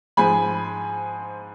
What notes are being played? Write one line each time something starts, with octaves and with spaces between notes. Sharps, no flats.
G#2 F3 G#3 G#5 B5